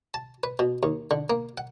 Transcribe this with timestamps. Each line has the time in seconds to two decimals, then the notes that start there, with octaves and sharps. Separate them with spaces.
0.14 A5
0.43 B4
0.59 B2
0.83 D#2
1.11 D3
1.30 A#3
1.58 F#5